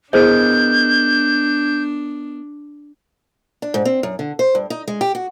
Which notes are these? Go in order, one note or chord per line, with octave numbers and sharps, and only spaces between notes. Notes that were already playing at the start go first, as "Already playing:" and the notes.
B3 D4 E4 G#4 A#4 C5 D#5 G6
D4
G#2
C4
F#2
D3
C5
G2
D#4
G#3
G4
F#4